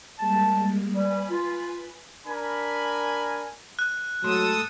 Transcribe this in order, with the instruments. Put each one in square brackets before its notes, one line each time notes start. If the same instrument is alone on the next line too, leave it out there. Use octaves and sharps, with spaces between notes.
[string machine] G3 G#3 A#3 [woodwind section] A5
[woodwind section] G3 [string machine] B4 G#5 B5
[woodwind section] F4
[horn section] D4 A#4 G#5 B5
[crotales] F#6
[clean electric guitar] G#2 A3 C6 [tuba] F#3 [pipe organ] A4 D#6 E6